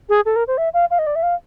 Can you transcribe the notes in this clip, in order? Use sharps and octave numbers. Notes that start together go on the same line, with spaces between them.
G#4
A4
A#4
C5
E5
F5
F5
D#5
D5
E5
F5